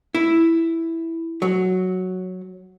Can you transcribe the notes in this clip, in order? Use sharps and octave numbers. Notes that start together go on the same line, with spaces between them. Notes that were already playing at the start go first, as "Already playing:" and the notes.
E4
F#3